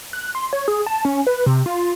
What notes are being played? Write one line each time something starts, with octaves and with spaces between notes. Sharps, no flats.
F#6
C6
C#5
G#4
A5
C#4
B4
C3
F4